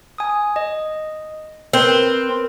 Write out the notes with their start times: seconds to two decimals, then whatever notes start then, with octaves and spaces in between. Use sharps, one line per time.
0.18 G#5 D#6
0.56 D#5
1.73 C4 A#4 B4